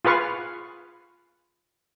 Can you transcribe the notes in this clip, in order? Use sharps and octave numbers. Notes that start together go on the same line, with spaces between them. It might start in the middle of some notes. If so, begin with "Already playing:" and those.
F4 G#4 B4 F5 C#6